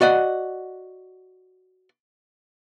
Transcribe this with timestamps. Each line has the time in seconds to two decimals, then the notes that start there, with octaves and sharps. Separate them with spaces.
0.01 F#4 D5 D#5 F#5